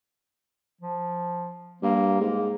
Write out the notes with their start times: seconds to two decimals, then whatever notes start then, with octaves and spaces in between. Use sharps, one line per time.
0.81 F3
1.82 G2 A#3
2.20 G#2 A#3